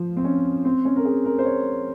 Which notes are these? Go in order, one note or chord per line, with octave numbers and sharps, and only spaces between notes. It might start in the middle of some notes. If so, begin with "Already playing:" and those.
Already playing: F3
C4
C#4
C4
C#4
A#4
G#4
A#4
C5
C#5